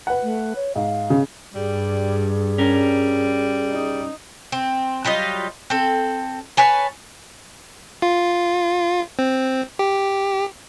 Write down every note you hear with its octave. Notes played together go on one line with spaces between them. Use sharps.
B4 F#5
A3
C#5
G#2 F5
C#3
G2 G3 G#4
G3 C#4 A#4
D#4
C4
F#3 G3 F4 D#5
C4 A4
B4 C#5 G#5 A5
F4
C4
G4